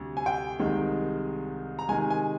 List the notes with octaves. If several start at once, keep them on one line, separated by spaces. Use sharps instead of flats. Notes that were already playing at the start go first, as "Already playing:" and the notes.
Already playing: D2 C3 G3 D4
G#5
G5
C2 C3 D#3 G#3
A#5
C3 D#3 G#3 G#5
G#5